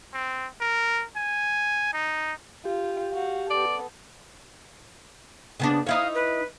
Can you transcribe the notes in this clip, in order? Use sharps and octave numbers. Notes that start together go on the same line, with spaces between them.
C4
A#4
G#5
D#4
F4 G4
F#4 F5
B3 A4 D5
C#3 B3 D4
D#4 E4 C#5 F5
B4